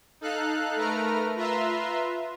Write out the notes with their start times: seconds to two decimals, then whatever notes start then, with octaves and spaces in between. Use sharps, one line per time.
0.21 D#4 A4 F5 F#6
0.76 A3 A#4 B4 A#5 F6
1.36 F4 B4 E5 A#5 C6